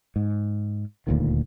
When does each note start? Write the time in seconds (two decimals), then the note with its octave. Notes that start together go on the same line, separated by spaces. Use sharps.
0.16 G#2
1.07 D#1 D2 A#2 D#3